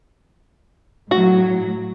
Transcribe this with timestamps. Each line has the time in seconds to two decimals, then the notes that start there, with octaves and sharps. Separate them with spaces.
1.11 A2 F#3 F#4